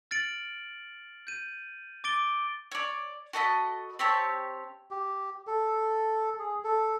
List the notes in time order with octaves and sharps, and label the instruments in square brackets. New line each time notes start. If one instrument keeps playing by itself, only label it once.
[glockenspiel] F6 A6 C#7 D7 F#7
G6 D#7
D6 A6 D7 G7
[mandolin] C#5 D5
F#4 A4 D#5 B5
C4 G4 C#5 A5
[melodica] G4
A4
G#4
A4